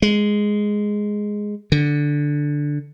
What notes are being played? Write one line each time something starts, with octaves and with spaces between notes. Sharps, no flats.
G#3
D3